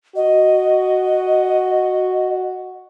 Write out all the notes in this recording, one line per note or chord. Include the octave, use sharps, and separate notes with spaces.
F#4 D#5